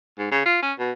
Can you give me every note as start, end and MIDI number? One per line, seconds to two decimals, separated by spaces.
0.19 0.28 44
0.32 0.43 49
0.46 0.60 65
0.62 0.73 61
0.79 0.92 47